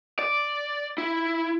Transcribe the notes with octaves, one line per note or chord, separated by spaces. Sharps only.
D5
E4